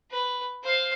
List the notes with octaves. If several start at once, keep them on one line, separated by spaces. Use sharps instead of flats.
B4
C5 F5